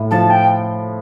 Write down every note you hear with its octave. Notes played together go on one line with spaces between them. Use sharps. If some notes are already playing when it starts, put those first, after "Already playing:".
Already playing: A2
F3 A5
G5